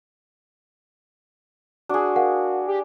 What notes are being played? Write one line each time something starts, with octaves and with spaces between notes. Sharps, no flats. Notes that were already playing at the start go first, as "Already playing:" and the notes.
D4 F#4 G#4
A#4 F5 F#5
G4